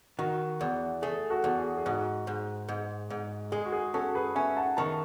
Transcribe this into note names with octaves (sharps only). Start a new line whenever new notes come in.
D#3 F#4
E2
A3 G#4
F#4 A4
E2
G#4
G#4
G#2 F#4
G#2
G#2
G#2
G#3 G#4
F#4
G#4
C#4 F#4 A4
G#4 B4
C#4 E5 G#5
F#5 A5
D#3 A5 C#6